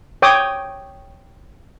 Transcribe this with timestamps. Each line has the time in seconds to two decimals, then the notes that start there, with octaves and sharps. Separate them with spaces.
0.22 C#5 G5 D6 D#6